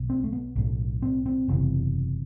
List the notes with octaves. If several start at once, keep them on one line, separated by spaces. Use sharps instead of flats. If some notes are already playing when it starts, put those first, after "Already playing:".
Already playing: B1 B2
C4
A3
B3
B1 A2
C4
C4
F#1 E2 C3